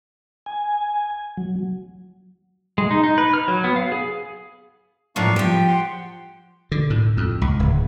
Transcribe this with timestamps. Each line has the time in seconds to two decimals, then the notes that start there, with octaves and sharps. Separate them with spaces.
0.46 G#5
1.37 F#3
2.78 G#3
2.91 D#4
3.04 D#4
3.18 B4
3.34 F6
3.48 F#3
3.64 B3
3.76 F5
3.92 G#4
5.16 F#2 A2 F3 D4 F5 C#6
5.36 F3 G4 G5
5.67 F#5 G5 C6
6.72 D3
6.90 A2
7.17 F2
7.42 C#2
7.59 D1